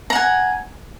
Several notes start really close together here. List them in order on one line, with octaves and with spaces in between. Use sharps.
A#5 F#5 G#5